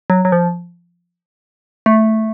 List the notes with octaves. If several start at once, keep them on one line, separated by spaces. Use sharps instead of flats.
F#3
F#3
F3
A3